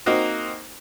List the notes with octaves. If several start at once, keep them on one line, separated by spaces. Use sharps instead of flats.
A#3 C4 D#4 F#4